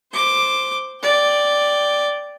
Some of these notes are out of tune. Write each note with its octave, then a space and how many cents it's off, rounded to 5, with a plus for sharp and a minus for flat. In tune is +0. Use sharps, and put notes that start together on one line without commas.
C5 +0 D6 +5
D5 +0 G5 +0